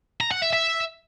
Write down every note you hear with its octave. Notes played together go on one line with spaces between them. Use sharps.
A#5
F#5
E5
E5